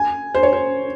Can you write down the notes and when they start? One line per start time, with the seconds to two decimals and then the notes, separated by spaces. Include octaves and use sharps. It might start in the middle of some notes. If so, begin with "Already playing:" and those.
Already playing: G#5
0.35 C5
0.43 C#5
0.53 C5